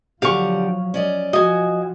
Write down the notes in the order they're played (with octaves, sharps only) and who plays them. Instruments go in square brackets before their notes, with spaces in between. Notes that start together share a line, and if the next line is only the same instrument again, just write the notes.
[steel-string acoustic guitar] D3 G4 F#5 [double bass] F3 F#3 [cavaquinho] F5 C#6
[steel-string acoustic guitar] C#4 D5 D#5
[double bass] F3 [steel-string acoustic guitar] F#4 [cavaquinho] D#5 G#5